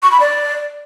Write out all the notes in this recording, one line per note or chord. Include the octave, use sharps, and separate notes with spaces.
C#6
B5
D5